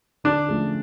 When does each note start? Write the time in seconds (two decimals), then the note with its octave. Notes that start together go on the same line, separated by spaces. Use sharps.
0.24 D3 D4
0.48 F3 A3 C#4 G#4